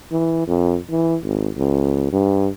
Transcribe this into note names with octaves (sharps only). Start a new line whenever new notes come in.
E3
F2
E3
G#1
C#2
G2